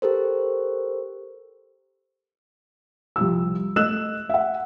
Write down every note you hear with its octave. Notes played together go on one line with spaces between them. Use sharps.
G4 A4 A#4 C5
C2 F3 E6
A3 D#5 E6 F#6 E7
E5 F#5